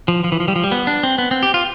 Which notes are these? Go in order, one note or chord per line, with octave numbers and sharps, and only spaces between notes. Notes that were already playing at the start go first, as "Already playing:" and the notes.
F3
F3
E3
F3
G3
F3
G3
B3
D4
C4
B3
C4
G4
F4